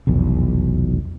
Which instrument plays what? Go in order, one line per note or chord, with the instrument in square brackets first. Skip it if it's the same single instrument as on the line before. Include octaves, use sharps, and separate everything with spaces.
[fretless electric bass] F1 B1 E2